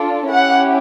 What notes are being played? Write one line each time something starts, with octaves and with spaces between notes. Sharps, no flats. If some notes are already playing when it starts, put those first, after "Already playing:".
Already playing: D4 F4 A4
C#4 E4 G4 F#5